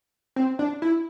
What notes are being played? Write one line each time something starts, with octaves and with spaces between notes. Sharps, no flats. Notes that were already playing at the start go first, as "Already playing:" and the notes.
C4
D4
E4